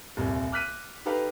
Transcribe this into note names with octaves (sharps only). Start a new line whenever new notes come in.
D#1 C2
D6 F6 F#6 B6 D#7
D#4 G4 A4 B4 F5